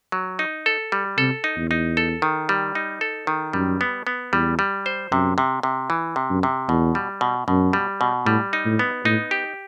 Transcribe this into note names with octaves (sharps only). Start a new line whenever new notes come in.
F#3
D#4
A4
G3
C3 A4
D#4
E2
D#4
A4
D#3
G3
D#4
A4
D#3
F#2 G3
B3
B3
E2 G3
G3
C5
F#2 C3
C3
C3
E3
C3
F#2
C3
E2 B2
G3
B2
F#2 B2
G3
B2
A2 G3
D#4
A2
B3
A2 D#4
G4